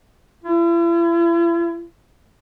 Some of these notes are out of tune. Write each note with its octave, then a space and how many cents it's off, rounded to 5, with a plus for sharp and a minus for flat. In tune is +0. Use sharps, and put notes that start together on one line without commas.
E4 +45